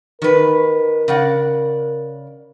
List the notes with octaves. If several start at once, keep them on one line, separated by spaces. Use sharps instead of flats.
D#3 A#4 B4
C#3 D5 F#5